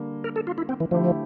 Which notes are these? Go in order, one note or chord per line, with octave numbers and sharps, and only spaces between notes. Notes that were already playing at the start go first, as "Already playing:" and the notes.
Already playing: D3 G3 A#3
A#4
A4
F4
E4
C4
E3
D3 F3 A3 E4 G4